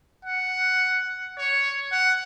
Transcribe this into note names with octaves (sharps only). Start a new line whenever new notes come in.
F#5
C#5
F#5